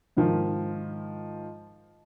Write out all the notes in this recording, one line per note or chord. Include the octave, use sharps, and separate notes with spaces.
G#2 D#3 F3